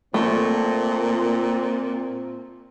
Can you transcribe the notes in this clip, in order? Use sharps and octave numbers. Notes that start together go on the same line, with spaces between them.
A#2 A3 C4